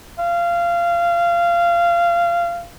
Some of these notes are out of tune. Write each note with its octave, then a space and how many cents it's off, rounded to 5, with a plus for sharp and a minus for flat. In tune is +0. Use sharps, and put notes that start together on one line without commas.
F5 -20